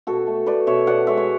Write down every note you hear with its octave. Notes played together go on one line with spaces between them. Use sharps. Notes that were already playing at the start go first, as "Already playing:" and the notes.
B2 F#4 A4
A3
A3 B4 D5
B2 C#5 E5
B2 D5 F#5
G#3 C#5 E5
C#5